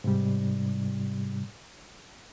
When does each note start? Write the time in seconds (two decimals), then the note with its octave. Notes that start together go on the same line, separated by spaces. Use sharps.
0.04 G#2 C3 G3